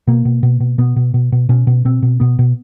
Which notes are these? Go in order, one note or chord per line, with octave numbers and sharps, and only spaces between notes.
B2 A#3
B2
B2
B2
B2 B3
B2
B2
B2
B2 C#4
B2
B2 C4
B2
B2 B3
B2